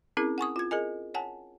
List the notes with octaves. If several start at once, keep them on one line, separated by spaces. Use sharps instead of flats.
C4 C#4 E4 G#4 A#4
F#5 G#5 C#6 D#6
F4 G#6
G#4 A#4 D#5 G#5
C#5 F#5 G#5 A5